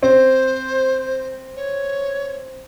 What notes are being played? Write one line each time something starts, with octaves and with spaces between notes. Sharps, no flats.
C4 C5
C#5